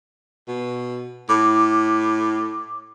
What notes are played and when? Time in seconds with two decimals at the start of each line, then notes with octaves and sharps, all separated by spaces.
0.48 B2
1.29 A2 D6